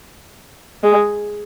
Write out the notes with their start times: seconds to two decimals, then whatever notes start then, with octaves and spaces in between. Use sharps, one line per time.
0.83 G#3